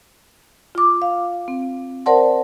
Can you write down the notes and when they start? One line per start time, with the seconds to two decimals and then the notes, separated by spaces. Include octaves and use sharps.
0.75 F4 D6
1.02 F5
1.48 C4
2.06 A#4 C5 D5 F#5 A5 C6